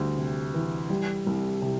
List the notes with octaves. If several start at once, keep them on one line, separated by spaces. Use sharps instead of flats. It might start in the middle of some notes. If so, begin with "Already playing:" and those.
Already playing: D2 G3
C3
E3
G3
C2
C3